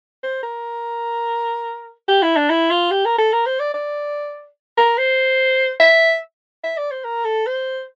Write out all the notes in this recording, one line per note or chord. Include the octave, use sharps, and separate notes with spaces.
C5
A#4
G4
E4
D4
E4
F4
G4
A#4
A4
A#4
C5
D5
D5
A#4
C5
E5
E5
D5
C5
A#4
A4
C5